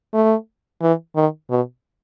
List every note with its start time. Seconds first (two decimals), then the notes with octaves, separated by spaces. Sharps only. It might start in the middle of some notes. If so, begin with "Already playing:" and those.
0.14 A3
0.82 E3
1.16 D#3
1.50 B2